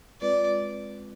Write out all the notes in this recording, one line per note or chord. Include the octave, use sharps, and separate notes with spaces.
G#3 C4 F4 B4 D5